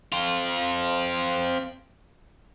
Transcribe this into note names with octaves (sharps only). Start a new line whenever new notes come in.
C4 F4